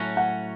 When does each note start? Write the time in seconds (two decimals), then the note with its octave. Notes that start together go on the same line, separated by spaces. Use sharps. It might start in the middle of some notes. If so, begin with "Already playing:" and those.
Already playing: A2 F#3 C#4 F#4
0.17 F#5